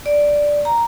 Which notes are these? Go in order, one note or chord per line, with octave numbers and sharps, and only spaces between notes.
D5
A#5